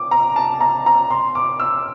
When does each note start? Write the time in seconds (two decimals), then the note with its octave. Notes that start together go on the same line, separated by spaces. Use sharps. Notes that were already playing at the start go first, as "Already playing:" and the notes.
Already playing: D6
0.11 A#5
0.36 A5
0.61 A#5
0.86 A#5
1.10 C6
1.35 D6
1.60 E6